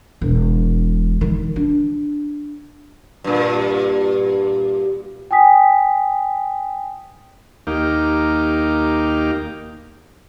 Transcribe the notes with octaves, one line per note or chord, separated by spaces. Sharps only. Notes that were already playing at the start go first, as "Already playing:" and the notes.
E1
D#3
D4
G2 A#2
G5 G#5 D#6 B6
D#2 A#3 D#4 G4 F5 D6